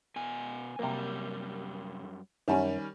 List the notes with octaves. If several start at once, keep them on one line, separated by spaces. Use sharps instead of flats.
B2 G#5
F#2 C3 G3 A#3
F#2 D#3 G3 C#4 A5